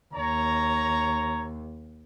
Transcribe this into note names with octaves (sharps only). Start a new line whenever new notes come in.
D#2 C#5 A#5